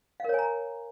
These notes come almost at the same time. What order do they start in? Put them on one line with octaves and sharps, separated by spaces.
F5 A#4 C#5 G#5 A#5